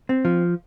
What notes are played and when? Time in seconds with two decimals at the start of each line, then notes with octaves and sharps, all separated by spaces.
0.09 C4
0.25 F3